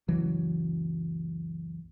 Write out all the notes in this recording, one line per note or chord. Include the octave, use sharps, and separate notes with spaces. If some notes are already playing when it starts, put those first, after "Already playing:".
F#1 C#2 E3 F#3